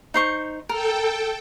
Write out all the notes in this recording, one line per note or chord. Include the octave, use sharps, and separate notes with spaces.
D#4 C5 C#6
A4 A#4 G5